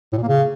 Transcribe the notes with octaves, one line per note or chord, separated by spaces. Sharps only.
A2
A#2
A#3
C#3